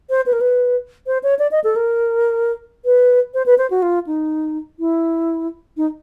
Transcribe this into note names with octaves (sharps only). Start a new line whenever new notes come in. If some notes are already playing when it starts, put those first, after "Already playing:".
C5
B4
A#4
B4
C5
C#5
D5
D#5
A4
A#4
B4
C5
B4
C5
F#4
F4
D#4
E4
D#4